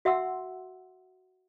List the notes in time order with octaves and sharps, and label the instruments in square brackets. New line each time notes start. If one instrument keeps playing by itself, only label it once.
[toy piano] F#4 E5 F#5 C6 E6